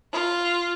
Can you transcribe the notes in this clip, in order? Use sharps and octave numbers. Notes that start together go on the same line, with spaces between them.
F4